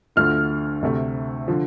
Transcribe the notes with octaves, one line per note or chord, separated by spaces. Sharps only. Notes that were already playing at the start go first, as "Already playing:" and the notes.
D2 D3 A3 F4 F6
D2 C3 A3
D3 F3